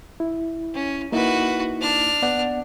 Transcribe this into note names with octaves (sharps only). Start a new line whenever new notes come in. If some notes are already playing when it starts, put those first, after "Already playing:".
E4
C#4
A#3 D#4 E4 F#4 B4
D4 F6
B3 D5 F#5